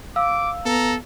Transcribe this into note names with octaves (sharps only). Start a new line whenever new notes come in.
F5 D6 E6
B3 A4 A#5